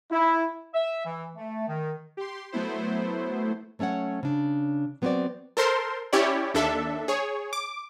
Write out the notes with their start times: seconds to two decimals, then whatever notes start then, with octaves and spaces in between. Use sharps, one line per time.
0.11 E4
0.74 E5
1.05 E3
1.36 A3
1.67 D#3
2.17 G4 C6
2.52 F#3 A3 B3 E4 C5
3.79 F#3 A3 C#4 C#5 F#5
4.23 C#3 D4
5.02 F#3 B3 C4 E4 F#4 D5
5.57 A4 A#4 C5 C6
6.13 C#4 E4 G4 C#5 D5
6.54 D#2 D4 A4 E5
7.08 G#4 C#5
7.53 D6